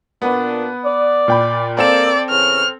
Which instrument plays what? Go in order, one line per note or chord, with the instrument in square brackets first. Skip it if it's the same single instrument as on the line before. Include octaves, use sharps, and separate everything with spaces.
[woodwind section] A#2 D4 [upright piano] B3 B4
[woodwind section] D5
[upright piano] A#2 G5 B5
[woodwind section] A#3 [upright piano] C4 A4 E7 [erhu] D5
[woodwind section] E2 C#3 C#4 [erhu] F6